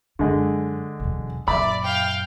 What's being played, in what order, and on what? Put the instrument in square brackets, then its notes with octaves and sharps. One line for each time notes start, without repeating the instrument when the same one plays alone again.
[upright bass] F#2 [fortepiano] D3 G#3
[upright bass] B1 E2
[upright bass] F#2 A#2 [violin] D5 [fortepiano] E5 B5
[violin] F5 G5